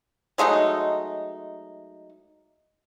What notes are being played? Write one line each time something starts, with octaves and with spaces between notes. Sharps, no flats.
F#3 G#3 A3 D#4